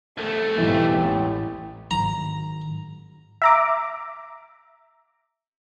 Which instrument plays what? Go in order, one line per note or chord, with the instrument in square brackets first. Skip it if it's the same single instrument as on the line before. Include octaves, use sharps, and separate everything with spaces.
[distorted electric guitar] C2 A3 [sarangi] A4
[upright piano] B1 E2 G#2 [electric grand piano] E3 [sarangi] G4
[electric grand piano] A1 [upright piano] E4
[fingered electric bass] G#2 D#3 F#3 [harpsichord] A#5
[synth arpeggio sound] E5 A#5 D6